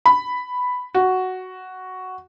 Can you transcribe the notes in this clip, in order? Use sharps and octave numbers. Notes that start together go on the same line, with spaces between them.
B5
F#4